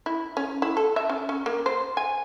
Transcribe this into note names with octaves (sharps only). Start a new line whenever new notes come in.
E4
C#4
E4
A4
E5
C#4
C#4
A#3
C5
G#5